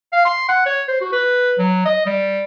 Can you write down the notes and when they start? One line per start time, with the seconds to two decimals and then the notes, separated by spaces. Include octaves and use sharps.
0.13 F5
0.25 C6
0.49 F#5
0.66 C#5
0.89 C5
1.01 F#4
1.13 B4
1.59 F#3
1.86 D#5
2.06 G3